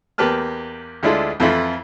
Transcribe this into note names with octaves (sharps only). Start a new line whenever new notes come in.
E2 A#3 G4 B4 A5 F6
D2 G#3 D4 E4 F4 A4
F2 E3 A3 E4 F4